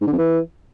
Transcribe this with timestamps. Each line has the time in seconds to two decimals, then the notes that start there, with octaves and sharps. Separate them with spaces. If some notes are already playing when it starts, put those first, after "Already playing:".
0.01 G#2
0.07 D3
0.12 F2
0.18 E3